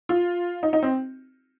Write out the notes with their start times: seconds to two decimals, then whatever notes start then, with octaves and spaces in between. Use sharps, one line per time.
0.09 F4
0.63 D#4
0.73 D#4
0.83 C4